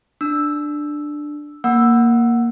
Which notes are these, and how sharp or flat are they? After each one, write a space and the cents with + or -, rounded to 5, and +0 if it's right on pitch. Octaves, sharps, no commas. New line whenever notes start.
D4 +10 E6 +0
A#3 +0 F#5 +0 E6 +0